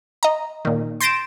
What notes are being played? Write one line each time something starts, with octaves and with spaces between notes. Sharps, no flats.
D#5 A#5
A#2 D#3
C6 G6 A6 A#6 D7 E7